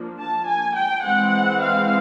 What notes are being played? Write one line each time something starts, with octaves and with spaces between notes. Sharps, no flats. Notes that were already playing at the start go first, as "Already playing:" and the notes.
Already playing: F3 A#3 D4
A5
G#5
G5
E3 G#3 C4 F#5
F5